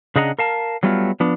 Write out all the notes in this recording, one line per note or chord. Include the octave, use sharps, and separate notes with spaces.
C#3 D4 G#4 D#5 F#5 A#5
A#4 F5 A5
F#3 G3 A3 B3 F4
F3 B3 D4